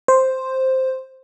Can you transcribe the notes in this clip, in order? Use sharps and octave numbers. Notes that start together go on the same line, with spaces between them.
C5